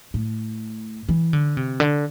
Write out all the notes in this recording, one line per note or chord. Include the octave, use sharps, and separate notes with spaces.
A2
E3
D3
C3
D3